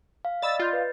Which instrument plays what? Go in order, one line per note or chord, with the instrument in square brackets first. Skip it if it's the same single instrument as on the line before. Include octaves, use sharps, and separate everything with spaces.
[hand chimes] F5
[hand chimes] D5 D#5 B5 [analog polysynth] E6 A6
[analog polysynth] F4 [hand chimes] G6 A6
[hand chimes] B4